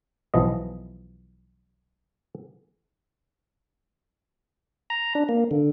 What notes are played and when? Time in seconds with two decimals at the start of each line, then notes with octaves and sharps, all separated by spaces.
0.34 B1 E3 F3 D#5
4.90 A#5
5.15 D4
5.29 A#3
5.51 D3